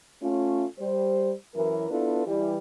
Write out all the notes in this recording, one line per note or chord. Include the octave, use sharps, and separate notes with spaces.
A3 C#4 F4
G3 C5
F#2 E3 A#4
B3 D4 E4 F4 A4 B4
E3 G3